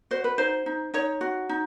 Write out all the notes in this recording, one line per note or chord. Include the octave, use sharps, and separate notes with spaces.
F#4 C5
B4
D#4 C5
D#4
D#4 C#5
F#4
D#4